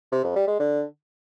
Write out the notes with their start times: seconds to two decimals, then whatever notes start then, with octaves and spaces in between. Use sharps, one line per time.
0.12 C3
0.24 F2
0.36 G3
0.48 G#3
0.59 D3